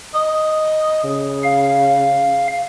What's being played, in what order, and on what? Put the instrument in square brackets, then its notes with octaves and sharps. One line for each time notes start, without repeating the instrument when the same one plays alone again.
[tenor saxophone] D#5
C#3
[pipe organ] F5